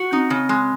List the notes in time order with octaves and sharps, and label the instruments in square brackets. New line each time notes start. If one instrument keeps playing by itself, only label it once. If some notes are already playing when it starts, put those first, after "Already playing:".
Already playing: [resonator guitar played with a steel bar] F#4
[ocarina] C4 C#4 [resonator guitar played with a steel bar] D#4
[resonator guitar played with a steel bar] C#3
G#3